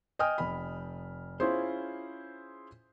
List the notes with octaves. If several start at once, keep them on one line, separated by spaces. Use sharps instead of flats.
D#5 G5 G#5 D#6 F6
F1 B5
C#4 E4 F4 G#4 C5